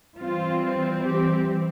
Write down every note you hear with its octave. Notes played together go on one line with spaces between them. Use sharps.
E3 G3 C4 F4
G4